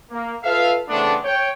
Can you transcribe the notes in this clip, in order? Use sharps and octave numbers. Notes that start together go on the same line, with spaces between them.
A#3
F4 A4 B4 E5 F5
C#3 E3 A3 B3 C4 D4
C#5 G5